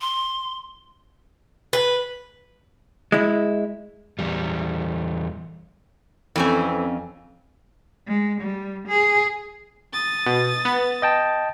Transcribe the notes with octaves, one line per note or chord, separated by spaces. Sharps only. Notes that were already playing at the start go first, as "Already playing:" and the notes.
C6
B4
G#3 E4
E2 G3
F2 E3 C4 C#4 G#5
G#3
G3
G#4
D#6 A6
B2
B3
D#5 G5 A5